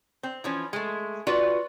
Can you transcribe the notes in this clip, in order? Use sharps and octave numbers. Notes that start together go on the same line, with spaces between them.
C4
E3 F3 C#4
G#3 A3
F4 F#4 B4 D5